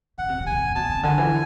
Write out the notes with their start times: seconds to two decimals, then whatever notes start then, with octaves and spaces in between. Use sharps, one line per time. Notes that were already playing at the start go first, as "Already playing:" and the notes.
0.18 C#3 F#5
0.29 C3
0.40 B2
0.47 C3 G#5
0.63 C3
0.75 B2 A5
0.89 C3
1.03 D3 G#5
1.18 E3